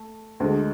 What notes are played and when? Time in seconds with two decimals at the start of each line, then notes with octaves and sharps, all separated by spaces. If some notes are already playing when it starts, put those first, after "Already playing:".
Already playing: A3
0.40 D2 D3 G#3